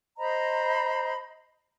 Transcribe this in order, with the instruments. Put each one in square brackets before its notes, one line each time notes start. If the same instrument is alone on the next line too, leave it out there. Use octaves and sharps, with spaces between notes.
[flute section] C5 D#5 A#5 B5